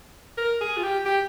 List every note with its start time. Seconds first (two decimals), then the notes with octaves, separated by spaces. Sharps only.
0.38 A#4
0.61 G#4
0.77 F4
0.83 G4
1.06 G4